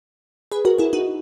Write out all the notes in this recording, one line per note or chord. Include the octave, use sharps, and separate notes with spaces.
G#4 B4
F#4 A#4
E4 G#4
D#4 F#4